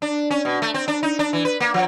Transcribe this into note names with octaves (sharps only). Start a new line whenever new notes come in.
D4
C#4
B2
A3
C4
D4
D#4
D4
E3
B4
A#3
F3